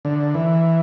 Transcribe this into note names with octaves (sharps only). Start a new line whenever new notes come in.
D3
E3